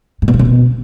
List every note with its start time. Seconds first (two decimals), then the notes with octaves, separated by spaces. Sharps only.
0.22 A2
0.28 B2
0.34 A#2
0.39 C#3
0.45 B2